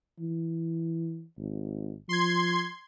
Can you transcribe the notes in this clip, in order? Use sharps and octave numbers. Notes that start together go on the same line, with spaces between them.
E3
G#1
F3 C6 G#6